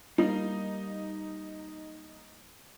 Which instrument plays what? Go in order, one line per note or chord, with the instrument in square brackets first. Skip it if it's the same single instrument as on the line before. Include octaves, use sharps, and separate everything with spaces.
[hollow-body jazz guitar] G3 A#3 [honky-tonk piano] D#4